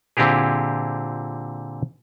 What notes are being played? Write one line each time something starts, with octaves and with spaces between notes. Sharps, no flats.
A#2 D3 C4 E4 G4 G#4